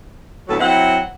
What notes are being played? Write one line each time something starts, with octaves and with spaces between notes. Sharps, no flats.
D2 A2 F#3 A3 B3 A4
F#3 C4 E4 F#5